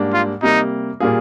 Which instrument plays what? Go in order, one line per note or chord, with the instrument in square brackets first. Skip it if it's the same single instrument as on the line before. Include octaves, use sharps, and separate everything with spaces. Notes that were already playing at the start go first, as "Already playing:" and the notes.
Already playing: [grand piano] G#2 G3 A#3 D4
[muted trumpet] F4
[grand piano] C3 G3 A#3 [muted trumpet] D#4
[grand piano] A#2 G3 A#3 F4 G#4